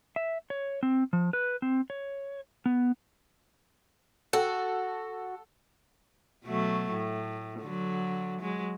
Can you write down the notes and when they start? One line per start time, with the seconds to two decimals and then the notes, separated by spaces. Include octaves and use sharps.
0.16 E5
0.50 C#5
0.83 C4
1.13 F3
1.33 B4
1.62 C4
1.90 C#5
2.66 B3
4.33 F#4 A4
6.44 B2 F#3 A3
6.91 A2
7.60 D3 F#3
8.41 F#3 G#3